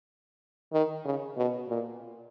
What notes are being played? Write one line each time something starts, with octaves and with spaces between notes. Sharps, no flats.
D#3
C#3
B2
A#2